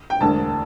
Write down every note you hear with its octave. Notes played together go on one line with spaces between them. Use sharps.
G5
E1 D2 D3 A5